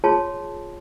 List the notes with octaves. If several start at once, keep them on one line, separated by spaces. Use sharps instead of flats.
F4 G#4 C#5 A5 C6